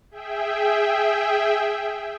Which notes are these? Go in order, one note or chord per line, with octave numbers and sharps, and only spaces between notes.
G#4 E5 G5